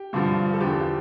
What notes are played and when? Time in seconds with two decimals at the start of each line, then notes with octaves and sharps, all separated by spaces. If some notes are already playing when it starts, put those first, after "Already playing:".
Already playing: G4
0.13 G2 D3 F3
0.53 A4
0.60 E2 D3 F3 G4